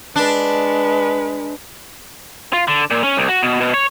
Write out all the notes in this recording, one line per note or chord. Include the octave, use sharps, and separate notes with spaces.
G#3 D4 B4
F4
D3
A#2
C#4
C2
F#4
B2
B2
C#5